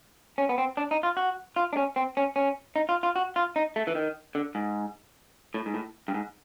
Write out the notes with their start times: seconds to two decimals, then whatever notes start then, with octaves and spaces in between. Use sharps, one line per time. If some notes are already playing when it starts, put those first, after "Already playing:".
0.38 C#4
0.49 B3
0.58 C4
0.77 D4
0.91 D#4
1.03 F4
1.17 F#4
1.56 F4
1.73 D4
1.77 C#4
1.96 C4
2.17 C#4
2.36 C#4
2.76 D#4
2.89 F4
3.03 F4
3.16 F#4
3.36 F4
3.56 D#4
3.76 A3
3.87 E3
3.95 D#3
4.35 D3
4.55 G#2
5.54 A2
5.66 G#2
5.74 A2
6.08 G2
6.14 G#2